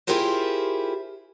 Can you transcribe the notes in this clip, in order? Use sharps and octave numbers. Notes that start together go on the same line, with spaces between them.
E4 F4 G4 G#4 A#4 C5